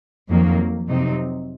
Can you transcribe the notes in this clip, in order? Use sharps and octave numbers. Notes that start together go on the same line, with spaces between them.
F2 D#3 F#3 A#3
F2 C3 F#3 C4 D#4